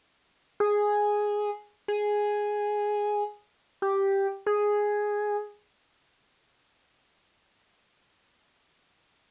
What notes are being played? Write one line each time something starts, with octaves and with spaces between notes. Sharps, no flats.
G#4
G#4
G4
G#4